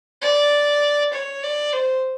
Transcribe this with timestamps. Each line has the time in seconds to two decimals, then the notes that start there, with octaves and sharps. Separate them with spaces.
0.22 D5
1.13 C#5
1.43 D5
1.73 C5